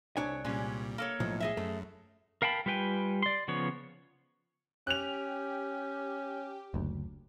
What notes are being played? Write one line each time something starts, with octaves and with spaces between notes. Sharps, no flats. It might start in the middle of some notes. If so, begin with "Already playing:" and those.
C2 D4 C#5 G#5
A#2 G3 G#3 C#4
A#3 A4 C#5
B1 A2 F3
G#4 D#5 E5
F#2 A3
A#4 F5 G5 A5 B5
G3 F4 B4 G5 G#5
D5 C6
C#3 F3 B3 C#5
C#4 G4 F#6 F7
F#1 D2